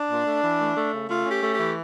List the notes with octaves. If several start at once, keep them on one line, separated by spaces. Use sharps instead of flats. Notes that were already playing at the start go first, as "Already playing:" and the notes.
Already playing: D4
A#2
A3
E3
A3
A3
C#3
A3 F4
C#4 G4
A3
G4
E3